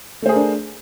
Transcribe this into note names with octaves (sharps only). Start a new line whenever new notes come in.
A3 D4 G#4 A#4 C5